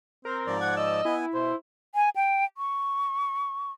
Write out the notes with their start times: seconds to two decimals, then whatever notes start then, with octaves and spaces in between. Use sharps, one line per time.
0.25 C4 A#4 C5
0.47 G#2 F3 D5
0.61 F#5 G#6
0.77 D#5 E6
1.05 B3 E4 G#5
1.34 B2 C5
1.95 G#5
2.16 G5
2.57 C#6